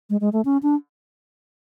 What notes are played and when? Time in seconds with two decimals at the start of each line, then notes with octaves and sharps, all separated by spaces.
0.10 G#3
0.21 G#3
0.33 A3
0.45 C#4
0.63 D4